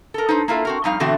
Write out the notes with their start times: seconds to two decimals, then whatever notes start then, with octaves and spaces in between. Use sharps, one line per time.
0.14 A4 A#4
0.29 D#4 B4 C5
0.48 A#3 E4 F4 A4
0.65 C4 F#4 A#4
0.84 F2 G3 D#4 F5
1.00 B2 D3 E3 A3 C4 F#4